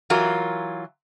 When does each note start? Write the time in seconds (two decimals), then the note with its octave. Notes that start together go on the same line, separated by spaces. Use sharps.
0.10 E3 F#3 F4 F#4 A#4